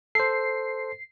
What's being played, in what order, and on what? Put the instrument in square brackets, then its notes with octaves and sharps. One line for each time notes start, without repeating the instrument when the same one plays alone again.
[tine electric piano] A4 C5 [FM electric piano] C7